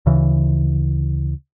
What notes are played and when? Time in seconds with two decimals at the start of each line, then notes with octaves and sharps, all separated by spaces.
0.06 D2 C#3 E3